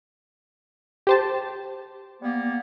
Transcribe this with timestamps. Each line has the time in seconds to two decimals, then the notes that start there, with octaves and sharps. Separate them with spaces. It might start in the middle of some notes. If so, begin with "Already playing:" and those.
1.07 G4 C5 A5
2.23 G3 A#3 B3